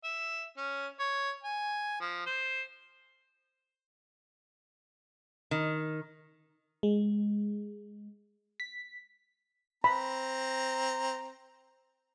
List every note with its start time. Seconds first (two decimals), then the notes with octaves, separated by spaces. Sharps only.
0.04 E5
0.57 C#4
1.00 C#5
1.43 G#5
2.00 F3
2.27 C5
5.51 D#3
6.83 G#3
8.60 B6
9.84 C4 A#5 B5